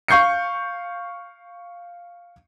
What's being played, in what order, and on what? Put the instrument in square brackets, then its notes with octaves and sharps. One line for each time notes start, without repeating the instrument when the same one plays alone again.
[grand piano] F5 C#6 G6 C7 C#7